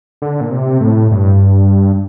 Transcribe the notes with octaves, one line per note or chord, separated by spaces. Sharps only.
D3
A#2
C3
A2
G2